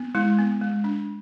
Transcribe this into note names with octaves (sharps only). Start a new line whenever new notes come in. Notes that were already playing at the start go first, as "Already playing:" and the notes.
Already playing: B3
G#3 E4
B3
G#3
D4